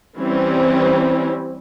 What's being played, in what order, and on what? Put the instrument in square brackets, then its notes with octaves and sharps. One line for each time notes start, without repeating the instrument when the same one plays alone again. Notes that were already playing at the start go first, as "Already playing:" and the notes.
[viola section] E3 G3 C4 C#4